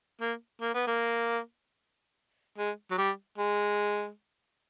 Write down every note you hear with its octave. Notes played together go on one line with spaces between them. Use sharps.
A#3
A#3
B3
A#3
G#3
F#3
G3
G#3